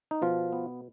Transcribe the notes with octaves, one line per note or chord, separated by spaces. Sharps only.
D#4
B2 F3 F4
B3